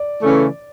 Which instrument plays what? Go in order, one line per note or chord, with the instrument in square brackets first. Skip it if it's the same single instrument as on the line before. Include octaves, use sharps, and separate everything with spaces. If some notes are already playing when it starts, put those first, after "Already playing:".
Already playing: [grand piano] D5
[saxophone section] C#3 E3 A3 C#4 E4